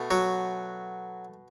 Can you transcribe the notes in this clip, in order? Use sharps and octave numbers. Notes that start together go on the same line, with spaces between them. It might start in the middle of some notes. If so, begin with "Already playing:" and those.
Already playing: B2 A3
F#3 F#4